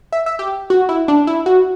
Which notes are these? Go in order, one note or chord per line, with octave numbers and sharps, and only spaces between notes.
E5
E5
G4
F#4
E4
D4
E4
F#4